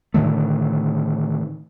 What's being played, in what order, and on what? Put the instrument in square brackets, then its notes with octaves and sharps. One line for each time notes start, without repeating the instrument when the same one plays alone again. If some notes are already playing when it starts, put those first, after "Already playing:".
[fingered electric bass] A2 D3 D#3 A3